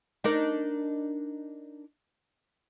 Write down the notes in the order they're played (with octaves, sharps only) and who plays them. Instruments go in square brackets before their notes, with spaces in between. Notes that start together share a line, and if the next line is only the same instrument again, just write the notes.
[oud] D4 D#4 A#4